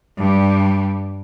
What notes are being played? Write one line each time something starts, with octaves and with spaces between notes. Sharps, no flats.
G2 G3